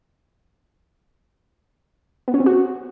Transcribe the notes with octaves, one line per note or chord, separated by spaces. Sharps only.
B3
C#4
C4
F#4